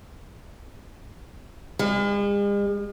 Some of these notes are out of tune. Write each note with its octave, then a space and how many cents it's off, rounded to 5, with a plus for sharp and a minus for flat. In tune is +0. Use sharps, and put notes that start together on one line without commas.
G#3 -45